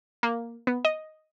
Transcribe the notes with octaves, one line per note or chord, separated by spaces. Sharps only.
A#3
B3
D#5